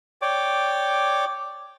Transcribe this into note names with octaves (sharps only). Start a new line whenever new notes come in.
C#5 D5 G5 D6